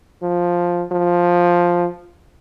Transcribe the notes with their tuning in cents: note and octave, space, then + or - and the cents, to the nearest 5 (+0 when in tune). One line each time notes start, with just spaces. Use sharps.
F3 +5
F3 +5